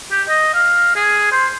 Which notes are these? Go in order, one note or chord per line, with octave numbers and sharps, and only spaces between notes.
G4
D#5
F5
G#4
C5